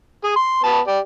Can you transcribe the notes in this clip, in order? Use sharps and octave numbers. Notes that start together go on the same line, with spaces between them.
G#4
C6
B3 A5
G4 D5